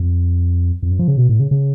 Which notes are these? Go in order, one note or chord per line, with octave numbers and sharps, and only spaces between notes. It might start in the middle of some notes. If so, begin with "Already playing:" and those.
Already playing: F2
F2
F#2
F3
C#3
B2
A2
C#3
C#3